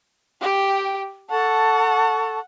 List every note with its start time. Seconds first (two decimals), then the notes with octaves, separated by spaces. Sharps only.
0.41 G4 G5
1.30 A4 F#5 A5 C#6